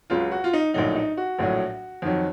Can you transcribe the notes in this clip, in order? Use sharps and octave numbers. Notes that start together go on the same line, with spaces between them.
C#2 C#3 F#3 F4
F#4
F4
D#4
A#1 A2 F#3 D#4
D#4
F#4
A#1 A2 F#3
F2 D#3 F#3